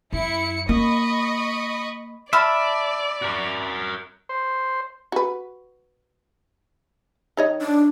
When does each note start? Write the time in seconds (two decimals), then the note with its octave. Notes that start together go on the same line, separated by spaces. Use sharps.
0.13 F#2 E4 C#7
0.69 A#3 D#5 B5 C#6
2.33 D5 E5 A5 B5 F6
3.22 F#4 A#4
4.29 C5
5.12 F#4 B4
7.37 D#3 C#5 D#5
7.61 D4